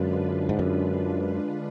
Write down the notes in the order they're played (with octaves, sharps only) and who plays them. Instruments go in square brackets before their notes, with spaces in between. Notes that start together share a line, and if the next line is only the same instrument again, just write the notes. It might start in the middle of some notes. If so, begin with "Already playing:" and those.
Already playing: [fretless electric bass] F#2 [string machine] D3 G#3 D4 F4 B4
[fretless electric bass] G#2
F#2